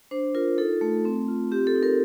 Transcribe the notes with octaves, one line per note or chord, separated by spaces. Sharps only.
D4 C5
F4 A#4
D#4 A4
A3
C4
F4
C4 G4
A4
D#4
A#4